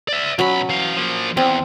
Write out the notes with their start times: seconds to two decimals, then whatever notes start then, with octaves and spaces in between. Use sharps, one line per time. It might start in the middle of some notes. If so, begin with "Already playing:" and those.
0.08 D5 E5
0.39 B1 F#3 C#4 B5
0.69 E3 F5
0.97 F3 A#3
1.37 E2 C4